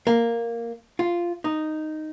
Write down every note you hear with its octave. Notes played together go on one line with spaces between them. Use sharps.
A#3
F4
D#4